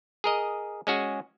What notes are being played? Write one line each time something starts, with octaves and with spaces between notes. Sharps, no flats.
G#4 A#4 D#5
G#3 C#4 F#4 G#4